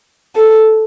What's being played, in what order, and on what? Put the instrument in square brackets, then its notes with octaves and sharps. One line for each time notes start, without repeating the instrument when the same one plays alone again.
[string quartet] A4